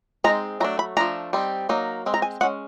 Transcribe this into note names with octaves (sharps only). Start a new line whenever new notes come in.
G#3 C4 D#4 A#5
F#3 A3 D4 A#5
B5
F3 A3 D4 A#5
G3 C4 D#4
F#3 A#3 D#4
G#3 C4
A#5
G#5
G#3 C#4 F#5